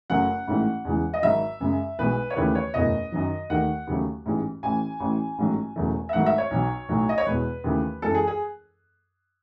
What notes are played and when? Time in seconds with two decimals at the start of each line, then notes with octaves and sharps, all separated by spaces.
0.10 F#1 F#2 C#3 F#3 A3 F#5
0.47 A1 G#2 E3 A3
0.85 E2 C#3 E3 G#3
1.14 D#5
1.22 G#1 G#2 F#3 E5
1.60 F#2 C#3 G#3
1.99 B1 B2 G#3 B4
2.30 C#5
2.36 D#2 C#3 E3 A3 B4
2.55 C#5
2.74 F#1 E2 B2 A3 D#5
3.12 F#2 D#3 F#3
3.50 D#2 D#3 A3 F#5
3.87 D#2 C#3 F#3 A3
4.25 A1 G#2 E3 G#3
4.63 A1 A2 E3 G#5
5.00 A1 A2 E3
5.38 A1 G#2 F#3 A3
5.76 E1 E2 C#3 F#3 A3
6.09 E5
6.13 G#1 G#2 F#3 A3 F#5
6.26 E5
6.38 C#5
6.51 B1 B2 F#3
6.89 B1 A2 F#3 A3
7.09 D#5
7.18 C#5
7.27 E2 B2 G#3 B4
7.64 D#2 C#3 E3 A3
8.02 F#2 E3 G#3 A4
8.15 G#4
8.27 G#4